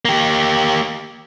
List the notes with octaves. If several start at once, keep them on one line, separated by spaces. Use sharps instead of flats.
A#3 G4